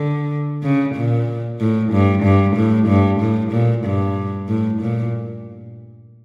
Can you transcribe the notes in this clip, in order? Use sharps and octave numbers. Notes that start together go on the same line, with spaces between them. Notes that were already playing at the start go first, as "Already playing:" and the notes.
Already playing: D3
C#3
A#2
A2
G2
G2
A2
G2
A2
A#2
G2
A2
A#2